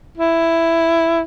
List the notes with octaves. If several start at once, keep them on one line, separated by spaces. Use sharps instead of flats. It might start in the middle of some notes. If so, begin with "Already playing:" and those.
E4